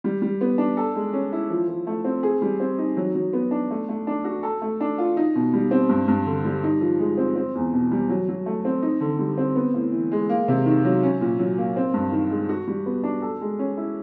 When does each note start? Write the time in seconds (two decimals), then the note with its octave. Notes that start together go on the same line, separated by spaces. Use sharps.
0.04 G3
0.22 G3
0.41 B3
0.58 D4
0.77 A4
0.95 G#3
1.13 C#4
1.32 E4
1.50 F3
1.68 F3
1.87 A3
2.05 C4
2.23 G#4
2.42 G3
2.60 C4
2.78 D#4
2.97 F#3
3.15 F#3
3.33 B3
3.51 D4
3.71 A3
3.89 A3
4.07 D4
4.24 F#4
4.43 A4
4.62 A3
4.80 D4
4.98 F4
5.17 D#4
5.35 B2
5.53 G3
5.71 C4
5.89 G2
6.08 G2
6.26 D3
6.45 G3
6.63 D#4
6.81 F3
6.99 G#3
7.18 C4
7.36 C4
7.55 E2
7.73 B2
7.91 G3
8.09 F#3
8.28 F#3
8.46 A3
8.65 C4
8.82 D#4
9.01 D3
9.19 G3
9.38 C4
9.55 B3
9.74 A2
9.92 E3
10.12 G#3
10.29 A#3
10.48 C3
10.66 D#3
10.84 F#3
11.03 C#4
11.21 A#2
11.39 F#3
11.58 A#3
11.76 C4
11.94 G2
12.12 D#3
12.30 G#3
12.49 F#4
12.67 G3
12.86 B3
13.03 D4
13.22 A4
13.41 G#3
13.59 C#4
13.77 E4